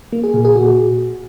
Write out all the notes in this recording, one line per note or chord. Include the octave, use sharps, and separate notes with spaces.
A#3
G#4
A#2
G#4
A#2 F#4